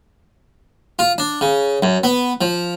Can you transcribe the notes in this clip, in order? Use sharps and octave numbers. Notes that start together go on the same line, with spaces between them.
F4
D4
C#3
F#2
B3
F3